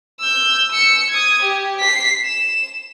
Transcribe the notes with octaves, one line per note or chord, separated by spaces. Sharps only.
E6 G6
E6 C#7
D#6 G#6
G4
B6 C7
E7